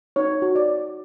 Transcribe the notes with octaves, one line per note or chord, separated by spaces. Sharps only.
D#4 C#5
F#4
D5
C#5